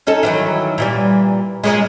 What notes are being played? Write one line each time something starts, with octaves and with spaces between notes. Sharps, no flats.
C#4 D#4 A4
D#3 E3 F#3
A#2 E3 G3
A#2 C#3 G#3